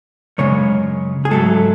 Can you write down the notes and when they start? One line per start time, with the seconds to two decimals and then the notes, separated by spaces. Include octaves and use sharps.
0.38 F#2 C#3 G#3 C#5
1.25 G#4
1.31 G#2 F#3 A3 A4